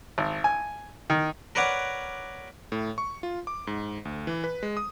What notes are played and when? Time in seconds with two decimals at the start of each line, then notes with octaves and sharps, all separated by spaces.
0.18 G#1
0.44 G#5
1.10 D#3
1.55 A#4 B4 C#5 D5 F#5
2.72 A2
2.98 C#6
3.23 F4
3.47 D6
3.67 G#2
4.05 D2
4.27 E3
4.44 B4
4.63 G#3
4.77 D#6